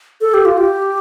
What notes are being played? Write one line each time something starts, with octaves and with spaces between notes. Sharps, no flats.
A4
G4
F4
G4